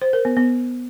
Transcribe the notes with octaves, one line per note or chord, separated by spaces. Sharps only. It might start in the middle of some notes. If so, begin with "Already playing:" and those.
C5
A#4
B3
B3